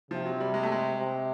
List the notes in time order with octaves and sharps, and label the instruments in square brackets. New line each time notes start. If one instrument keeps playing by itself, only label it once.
[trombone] C3 [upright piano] F3
[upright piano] F#3
G3
G#3
A3
G#3
[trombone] C3